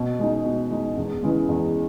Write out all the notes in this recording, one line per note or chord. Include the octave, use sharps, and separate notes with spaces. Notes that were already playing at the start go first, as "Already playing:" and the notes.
Already playing: B2
G#3 D#4
B2
G#3 D#4
E2
C#3 E3 G#3
E2